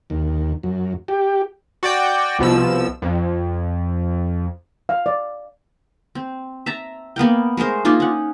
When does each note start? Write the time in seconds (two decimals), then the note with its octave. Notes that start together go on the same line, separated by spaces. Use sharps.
0.10 D#2
0.63 F#2
1.08 G4
1.83 F#4 D5 G5
2.39 C2 B2 F3 E6
3.02 F2
4.89 F5
5.06 D5
6.15 C4
6.66 E5 A5 A#5
7.16 A#3 B3 A#4 G5
7.57 G#3 A3 A#4 C5
7.85 A#3 D4 D#4 F4
8.00 C#4 F#5